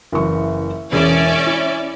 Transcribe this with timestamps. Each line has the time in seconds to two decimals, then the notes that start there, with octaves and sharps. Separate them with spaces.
0.12 F#1 E3 C#6
0.92 E1 E3 C#4 G#4 D5 E5
1.47 E4